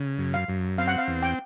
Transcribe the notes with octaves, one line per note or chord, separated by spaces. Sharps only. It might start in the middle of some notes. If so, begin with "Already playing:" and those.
Already playing: C#3
F#2
F5
F#2
C4 F5
F#5
F5
E2
G5